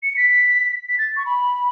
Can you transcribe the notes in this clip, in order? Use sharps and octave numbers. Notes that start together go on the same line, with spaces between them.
C#7
B6
B6
A6
C#6
B5